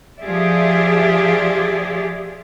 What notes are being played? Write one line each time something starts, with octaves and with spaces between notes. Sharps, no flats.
F3 G4 G#4 D5 E5